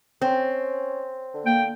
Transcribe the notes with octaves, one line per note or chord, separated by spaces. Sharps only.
C4 C#4
D3
A#3 G5